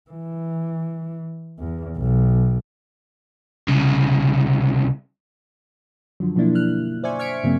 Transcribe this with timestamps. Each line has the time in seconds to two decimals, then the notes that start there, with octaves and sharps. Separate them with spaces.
0.11 E3
1.59 E2
1.97 B1
3.68 C2 C#3
6.20 F#2 D3 F3 F#3
6.35 B2 F3 F#3 A#3 D4 E4
6.55 F6 F#6
7.03 C5 D5 E5 G#5 C#6
7.19 C#6 F6 G#6 B6 C#7 D7
7.43 G2 C#3 F#3 A#3 C4